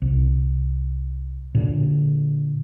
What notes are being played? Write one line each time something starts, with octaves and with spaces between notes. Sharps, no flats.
C2
A#2 D3